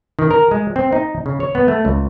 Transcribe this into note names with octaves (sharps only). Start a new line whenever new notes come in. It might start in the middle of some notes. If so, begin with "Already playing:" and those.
D#3
A#4
G#3
C4
D#4
C#3
C#5
B3
A3
C#2